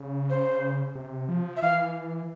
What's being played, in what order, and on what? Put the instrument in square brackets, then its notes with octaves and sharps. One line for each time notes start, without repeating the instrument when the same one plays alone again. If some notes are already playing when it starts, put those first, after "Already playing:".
Already playing: [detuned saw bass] C#3
[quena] C5
[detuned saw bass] C3
F3
[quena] E5
[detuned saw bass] E3 [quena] F5